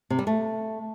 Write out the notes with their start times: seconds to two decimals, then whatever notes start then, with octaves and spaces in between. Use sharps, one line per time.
0.10 C3
0.19 G3
0.27 A3